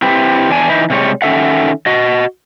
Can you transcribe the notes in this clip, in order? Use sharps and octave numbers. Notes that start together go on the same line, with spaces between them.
C4 E4 G4 B4
E2 D4 G#5
E3 D#4 E4
C3 G3 G#3 C#5
D#3 C#4 G4 A4 E5 F#5
F#4 D#5